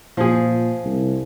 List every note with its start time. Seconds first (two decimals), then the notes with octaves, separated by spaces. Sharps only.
0.17 A#2 F3 G#4
0.85 C2